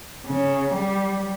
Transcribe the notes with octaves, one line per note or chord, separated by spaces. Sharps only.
C#3
G3